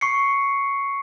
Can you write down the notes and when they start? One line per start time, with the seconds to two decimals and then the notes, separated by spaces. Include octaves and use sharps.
0.01 C#6 C7 C#7